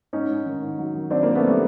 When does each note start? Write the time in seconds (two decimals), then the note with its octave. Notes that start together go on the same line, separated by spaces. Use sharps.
0.13 G#2 C#4 D#4
0.30 G#2
0.46 D#3
0.62 G#2
0.78 F#3
0.95 D#3
1.11 F#3 C4 D4
1.23 F#3 A#3 C4
1.35 A3 B3
1.47 G3 A3